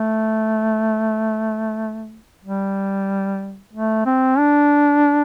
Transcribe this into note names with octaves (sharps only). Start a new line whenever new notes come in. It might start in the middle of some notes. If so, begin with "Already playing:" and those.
Already playing: A3
G3
A3
C4
D4